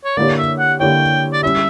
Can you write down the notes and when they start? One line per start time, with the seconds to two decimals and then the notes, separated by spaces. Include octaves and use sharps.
0.04 C#5
0.17 D3 A#3 E4 G4 C#5 D5
0.38 E5
0.59 F#5
0.80 D3 A#3 E4 G4 C#5 G5
1.33 D5
1.42 G3 C#4 E4 E5